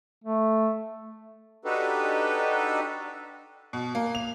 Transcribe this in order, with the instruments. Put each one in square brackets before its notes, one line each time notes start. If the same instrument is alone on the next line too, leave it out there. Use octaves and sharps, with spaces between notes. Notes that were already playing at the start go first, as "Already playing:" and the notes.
[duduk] A3
[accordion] D4 D#4 F#4 G4 A4 B4
[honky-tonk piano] B2
A#3
F7